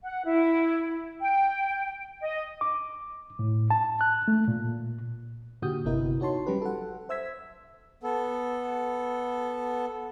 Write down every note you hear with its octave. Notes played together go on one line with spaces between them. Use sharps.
F#5
E4
G5
D#5
D6
A2
A5
F#6
A3
A#2
A#2 D3 F#4 G4 D#6 G6
G1 C3 B3 E4 A#4 D#5
D#4 F#4 C#5 A5 C6
F#3 G3 C#4 G4 B4
A4 F#5
C5 E5 E6 G#6 B6
B3 A4